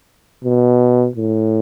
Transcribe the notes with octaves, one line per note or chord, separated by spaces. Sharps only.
B2
A2